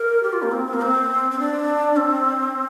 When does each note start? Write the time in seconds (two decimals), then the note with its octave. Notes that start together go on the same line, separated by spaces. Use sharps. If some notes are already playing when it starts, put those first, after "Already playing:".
Already playing: A#4
0.23 G4
0.33 F4
0.42 A#3
0.52 C4
0.66 C4
0.74 A#3
0.82 C4
1.31 C4
1.39 D4
1.96 C4